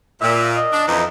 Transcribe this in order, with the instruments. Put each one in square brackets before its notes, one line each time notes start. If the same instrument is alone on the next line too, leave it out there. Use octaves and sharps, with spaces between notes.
[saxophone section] A#2 [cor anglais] E5
[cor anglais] D#5
[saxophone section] D4
[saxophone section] F2 E3 [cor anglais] D#4